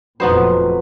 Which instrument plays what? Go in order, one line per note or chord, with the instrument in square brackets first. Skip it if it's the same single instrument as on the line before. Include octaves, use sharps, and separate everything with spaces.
[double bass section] F1 F2 A#2 [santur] F#3 B4 [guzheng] B3 D#4 C5